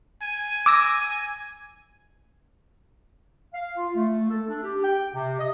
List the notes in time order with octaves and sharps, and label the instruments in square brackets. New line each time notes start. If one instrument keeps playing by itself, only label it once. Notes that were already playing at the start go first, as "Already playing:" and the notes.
[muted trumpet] G#5
[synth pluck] D6 E6 A#6
[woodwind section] F5
F4
A3
A4
D4
G4
G5
C3
D#5